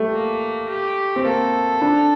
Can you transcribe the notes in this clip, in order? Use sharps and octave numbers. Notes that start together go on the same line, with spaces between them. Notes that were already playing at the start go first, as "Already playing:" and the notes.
Already playing: G3 A3
A#3
G4
C4
A#3 A4
D4